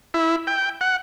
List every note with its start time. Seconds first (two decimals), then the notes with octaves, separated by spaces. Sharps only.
0.14 E4
0.47 G5
0.81 F#5